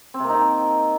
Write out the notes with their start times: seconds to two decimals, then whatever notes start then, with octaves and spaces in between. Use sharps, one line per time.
0.14 C4
0.19 C3
0.24 A#3
0.29 D#4
0.34 D#3